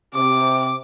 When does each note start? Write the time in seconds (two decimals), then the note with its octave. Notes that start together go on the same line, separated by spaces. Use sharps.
0.15 C3 D6